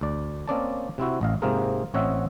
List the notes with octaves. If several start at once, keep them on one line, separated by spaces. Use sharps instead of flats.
D2 D5
A#3 C4 C#4 D5 D#5 A5
C3 C4 E4 F#4
A1 D#5 F5
G#2 C3 A#3 F4 G#4 A#4
A1 C4 C#5 D#5 E5 F#5